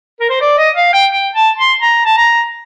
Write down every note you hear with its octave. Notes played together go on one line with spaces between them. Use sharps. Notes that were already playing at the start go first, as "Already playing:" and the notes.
A#4
C5
D5
D#5
F5
G5
G5
A5
C6
A#5
A5
A#5